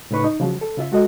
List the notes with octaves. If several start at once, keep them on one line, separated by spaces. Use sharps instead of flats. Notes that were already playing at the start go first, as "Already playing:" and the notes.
A2 C#3 D#4 B4 C#6
D#4
C#3 F3 F#3
A4
C#3 F4 E5
G#3 F#4 A4 D#5